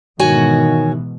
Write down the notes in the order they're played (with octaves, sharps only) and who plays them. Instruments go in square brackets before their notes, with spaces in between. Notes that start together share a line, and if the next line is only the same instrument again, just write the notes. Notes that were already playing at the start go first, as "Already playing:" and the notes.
[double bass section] G#2 B2 E3 [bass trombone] D#3 [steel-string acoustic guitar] F#4 C#5 G#5